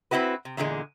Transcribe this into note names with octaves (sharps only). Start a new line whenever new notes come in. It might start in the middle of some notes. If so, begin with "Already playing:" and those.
C4 C#4 E4 F#4 B4
C3
E2 A#2 D3 G3 G#3